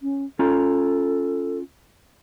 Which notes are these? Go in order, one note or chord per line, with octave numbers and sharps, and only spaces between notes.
C#4
C#4 F4 A4 A#5